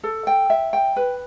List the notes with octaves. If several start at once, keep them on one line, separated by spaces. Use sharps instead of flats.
A4
G5
E5
G5
B4